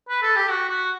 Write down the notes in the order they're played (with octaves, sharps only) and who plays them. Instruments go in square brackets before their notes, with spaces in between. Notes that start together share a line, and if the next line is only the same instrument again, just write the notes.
[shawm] B4
A4
G4
F#4
F#4